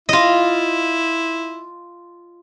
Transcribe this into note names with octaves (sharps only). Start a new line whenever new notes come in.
E4 F4 D#5